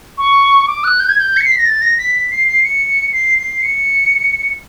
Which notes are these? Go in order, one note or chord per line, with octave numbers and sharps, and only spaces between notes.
C#6
D6
F#6
G6
G#6
G6
C#7
C7
B6
A#6
A6
A#6
B6
B6
C7
C7
C#7
C7
C7
C#7